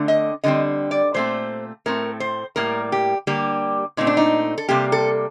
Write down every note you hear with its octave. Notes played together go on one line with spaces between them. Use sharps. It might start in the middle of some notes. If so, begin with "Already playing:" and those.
Already playing: D3 A3 C4
D#5
D3 G3 C4 D#5
D5
A#2 A3 C4 C5
A2 A3 C4 A#4
C5
A2 G3 A#3 A#4
G4
D3 G3 A#3 G4
A#2 A3 C4 D#4
D4
D#4
A4
C3 G3 A#3 G4
A4